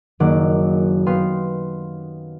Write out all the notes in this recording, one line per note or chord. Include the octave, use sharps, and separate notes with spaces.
F#1 D#3 F#3 A#3 F#5 D6
B3 G4 F5 C6